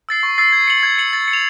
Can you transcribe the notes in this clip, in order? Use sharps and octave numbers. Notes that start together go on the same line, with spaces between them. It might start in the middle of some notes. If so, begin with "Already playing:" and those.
E6 A6 C7
C#6
E6 A6 C7
G#6
C#7 F#7
G#6
C#7 F#7
A6
C#7
F7